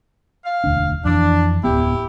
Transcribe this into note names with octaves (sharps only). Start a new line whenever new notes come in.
F5
E1 D2 D4
F2 E3 D4
D1 C#2 B3 E4 G4